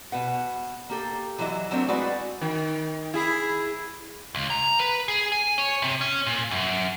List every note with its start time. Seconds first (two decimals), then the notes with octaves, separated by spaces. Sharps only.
0.12 B2 B4 F#5
0.90 A#3 G4 A4
1.38 E3 F#3 D4 E4 D#5
1.71 F#3 G3 A3 A#3 C4 D4
1.88 G#3 C4 E4 F#4 B4 D5
2.41 D#3
3.14 E4 G#4
4.35 C#2
4.50 A#5
4.79 B4
5.08 G#4
5.32 G#5
5.58 C#5
5.82 C3
6.01 C#4
6.26 A#2
6.51 F#2